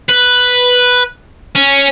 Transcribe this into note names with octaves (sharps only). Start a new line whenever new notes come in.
B4
C#4